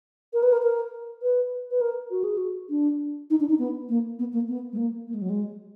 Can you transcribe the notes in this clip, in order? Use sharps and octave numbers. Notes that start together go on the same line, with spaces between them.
A#4
B4
A#4
A#4
B4
B4
A#4
F#4
G#4
F#4
D4
D#4
D4
D#4
B3
A#3
B3
A#3
B3
G#3
A#3
A#3
G#3
F#3
G#3